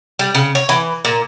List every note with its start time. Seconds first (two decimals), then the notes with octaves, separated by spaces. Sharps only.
0.19 G3
0.35 C#3
0.55 C#5
0.69 E3
1.05 A#2